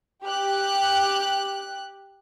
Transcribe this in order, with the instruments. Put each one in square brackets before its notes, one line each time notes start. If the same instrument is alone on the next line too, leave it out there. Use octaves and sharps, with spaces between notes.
[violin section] G4 F#6